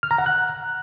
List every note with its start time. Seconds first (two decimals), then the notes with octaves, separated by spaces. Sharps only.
0.03 F6
0.11 A#5
0.18 F#5
0.26 F#6